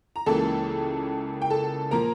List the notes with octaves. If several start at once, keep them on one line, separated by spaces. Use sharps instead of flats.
A#5
C#2 C#3 E3 A#3 A4 A5
G5
A4 A5
A#2 F3 A#3 A#4 A#5